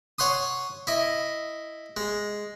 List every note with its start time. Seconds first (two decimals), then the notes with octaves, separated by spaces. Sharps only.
0.18 C#5 F#5 C6 D#6
0.87 E4 D#5
1.97 G#3